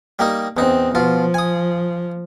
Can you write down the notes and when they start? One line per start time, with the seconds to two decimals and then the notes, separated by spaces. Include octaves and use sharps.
0.19 G3 A#3 D#4
0.57 E2 C4 D#4
0.95 B2 F3 F4
1.34 G#5 D#6